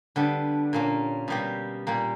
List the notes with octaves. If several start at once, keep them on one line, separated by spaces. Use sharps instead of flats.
D3 G3 B3 D4
A#2 A#3 C#4
B2 G3 A#3 G4
A#2 G3 A#3